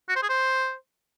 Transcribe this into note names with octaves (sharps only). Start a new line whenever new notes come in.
F#4
C5
G#4
C5